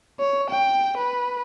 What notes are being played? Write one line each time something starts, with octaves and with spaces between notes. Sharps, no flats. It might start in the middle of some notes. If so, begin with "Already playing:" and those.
C#5
G5
B4